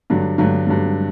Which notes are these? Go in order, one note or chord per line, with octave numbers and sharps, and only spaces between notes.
G2 D3 F#3
G2 D3 F#3
G2 D3 F#3